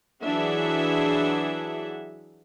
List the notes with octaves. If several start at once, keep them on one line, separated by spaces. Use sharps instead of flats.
E3 F#3 D4 G#4 E5 F#5